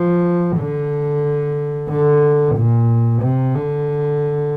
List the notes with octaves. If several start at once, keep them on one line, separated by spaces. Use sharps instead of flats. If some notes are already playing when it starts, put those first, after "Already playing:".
Already playing: F3
D3
D3
A#2
C3
D3